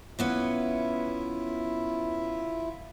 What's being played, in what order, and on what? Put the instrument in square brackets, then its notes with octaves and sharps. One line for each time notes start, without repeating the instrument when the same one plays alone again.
[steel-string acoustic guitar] E3 B3 C#4 [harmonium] E4 F4 E5